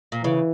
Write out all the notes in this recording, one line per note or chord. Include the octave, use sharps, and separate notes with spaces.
A#2
C#3 E3